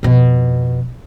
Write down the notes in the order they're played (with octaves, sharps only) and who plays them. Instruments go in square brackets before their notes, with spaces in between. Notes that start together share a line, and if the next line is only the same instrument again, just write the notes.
[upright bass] F2 B2